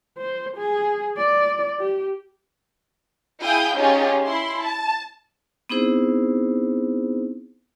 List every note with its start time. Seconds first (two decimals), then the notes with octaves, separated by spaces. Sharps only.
0.18 C5
0.56 G#4
1.17 D5
1.79 G4
3.41 E4 G#4 F5 G5 D#6 G6
3.75 C#4 D#4 F4 G4 G#4
4.25 E4 C6
4.62 A5
5.69 B3 C4 D#4 E4 G#4 C5